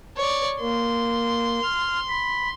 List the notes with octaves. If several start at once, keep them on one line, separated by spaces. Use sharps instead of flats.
C#5 D5
A#3 C6
F6
B5